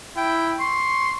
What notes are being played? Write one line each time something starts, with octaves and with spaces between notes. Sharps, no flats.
E4 G5
C6 C#6